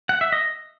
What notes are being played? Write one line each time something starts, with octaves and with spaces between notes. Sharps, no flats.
F#5
E5
D#5